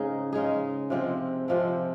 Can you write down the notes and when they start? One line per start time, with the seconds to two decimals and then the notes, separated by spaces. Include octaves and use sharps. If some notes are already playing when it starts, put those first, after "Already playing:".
Already playing: G#2 C#3 G#3 C#4 D#4 G#4
0.32 C#3 G#3 D#4 G#4
0.90 C3 F3 G#3 C4
1.48 C3 F3 G#3 C4